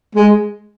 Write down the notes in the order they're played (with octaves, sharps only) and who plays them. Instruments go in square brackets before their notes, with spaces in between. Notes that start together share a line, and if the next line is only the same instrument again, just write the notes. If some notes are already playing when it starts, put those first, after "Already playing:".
[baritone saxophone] G#3